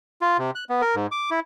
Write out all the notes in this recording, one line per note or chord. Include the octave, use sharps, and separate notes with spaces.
F4
C3
F#6
B3
A#4
G#2
D6
E4